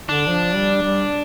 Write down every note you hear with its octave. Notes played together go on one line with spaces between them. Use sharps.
D3 D4
F3
G3
G3